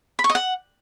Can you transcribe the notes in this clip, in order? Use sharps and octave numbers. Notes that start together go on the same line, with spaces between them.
B5
C#6
D#5
F#5